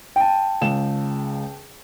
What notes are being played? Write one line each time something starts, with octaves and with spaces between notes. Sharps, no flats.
G5 A5
C#2 E7